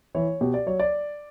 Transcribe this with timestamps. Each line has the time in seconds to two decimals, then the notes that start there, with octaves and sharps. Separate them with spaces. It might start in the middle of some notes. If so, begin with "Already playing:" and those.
0.15 E3 C#5
0.41 B2 G4
0.54 D5
0.66 F#3 C#5
0.80 D5